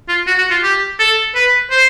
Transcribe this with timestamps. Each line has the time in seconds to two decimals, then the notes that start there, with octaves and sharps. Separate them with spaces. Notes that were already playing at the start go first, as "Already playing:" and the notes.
0.08 F4
0.27 F#4
0.38 F#4
0.50 F4
0.63 G4
0.99 A4
1.35 B4
1.71 C5